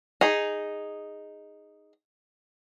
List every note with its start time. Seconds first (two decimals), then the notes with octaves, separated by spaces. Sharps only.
0.21 D#4 G#4